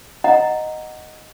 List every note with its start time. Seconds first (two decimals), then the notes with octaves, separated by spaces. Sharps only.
0.24 D#5 F#5 A#5